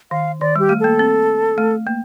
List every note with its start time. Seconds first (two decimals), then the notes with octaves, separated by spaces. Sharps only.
0.11 D#3 F5
0.41 D#3 D5
0.56 G3
0.59 G4
0.69 A3
0.80 A#3 A4
0.99 C4
1.58 A3
1.87 A#3